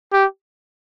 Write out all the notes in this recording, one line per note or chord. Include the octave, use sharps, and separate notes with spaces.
G4